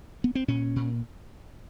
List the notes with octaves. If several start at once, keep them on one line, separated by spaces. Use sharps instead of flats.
B3
C4
A#2 C#4
A#2